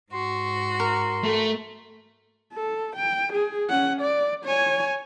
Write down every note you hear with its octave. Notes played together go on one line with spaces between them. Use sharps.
G#2 F#4 C6
A#4
A3
A4
G5
G#4
C#4 F#5
D5
C#5 G#5